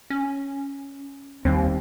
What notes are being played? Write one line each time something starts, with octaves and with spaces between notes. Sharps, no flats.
C#4
D#2 D#3 G3 C4